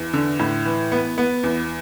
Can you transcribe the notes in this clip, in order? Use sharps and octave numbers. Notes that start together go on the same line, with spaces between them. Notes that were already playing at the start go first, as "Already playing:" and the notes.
Already playing: E2
D3
A2
E3
B3
B3
E2